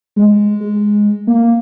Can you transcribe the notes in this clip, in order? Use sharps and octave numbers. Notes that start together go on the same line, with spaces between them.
G#3
G#3
A#3